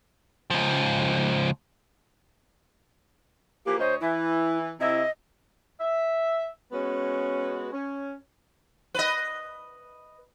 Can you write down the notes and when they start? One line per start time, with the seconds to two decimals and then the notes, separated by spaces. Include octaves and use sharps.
0.50 C#2 F3
3.65 E3 F3 A#3 G4
3.79 D2 C5 C#5 D#5
4.01 E3 E4
4.80 C3 E4 D#5
5.80 E5
6.72 G#3 B3 C#4 F#4
7.72 C#4
8.94 B4 D#5